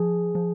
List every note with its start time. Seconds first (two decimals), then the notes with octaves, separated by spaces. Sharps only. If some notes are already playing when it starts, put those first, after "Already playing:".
Already playing: F3 G#4
0.35 F3